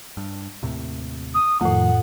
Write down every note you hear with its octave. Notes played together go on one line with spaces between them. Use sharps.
G2
D#2 A2 C3
D#6
F2 A2 D#3 F3 A3 F#5